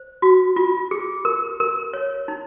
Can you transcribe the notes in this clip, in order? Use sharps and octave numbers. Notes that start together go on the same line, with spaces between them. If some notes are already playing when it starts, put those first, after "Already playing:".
Already playing: C5
F#4
F4
G#4
A#4
A#4
C#5
D#4